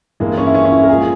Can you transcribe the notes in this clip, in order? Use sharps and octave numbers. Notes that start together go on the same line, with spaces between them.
G2 E3 G#3 A#3
C#4
E4
C#4
C#4
E4
A#4
A#2 F3 G#3 G#4